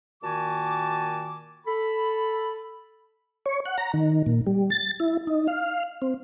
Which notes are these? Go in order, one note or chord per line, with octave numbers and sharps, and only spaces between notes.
A#2 D#3 F#4 G#5 A5 D6
A4 B5
C#5
F#5
A#5
D#3
A#2
G3
A6
E4
D#4
F5
C4